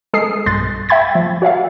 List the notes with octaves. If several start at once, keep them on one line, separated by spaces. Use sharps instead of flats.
G#3 G#4 A4 G#5 D#6 C7
B1 G2 C6 F#6 A6
E5 G5 B5 G#6 A6
F3
F#4 C#5 E5 F5